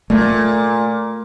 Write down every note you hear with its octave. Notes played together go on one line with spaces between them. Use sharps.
A#2 A3